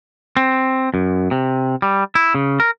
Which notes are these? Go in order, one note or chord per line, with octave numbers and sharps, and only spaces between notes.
C4
F#2
C3
G3
E4
C#3
A#4